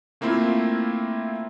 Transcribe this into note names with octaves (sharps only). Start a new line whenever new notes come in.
A3 A#3 C4 E4 F4